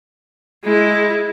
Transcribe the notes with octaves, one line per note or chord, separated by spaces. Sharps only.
G#3 E4